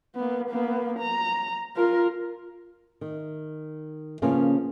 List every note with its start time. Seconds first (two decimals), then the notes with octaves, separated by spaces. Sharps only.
0.15 A#3 B3
0.50 A#3 B3
0.99 A#5
1.77 F4 A#4
3.01 D#3
4.22 C#3 F3 A#3 B3 C#4 F5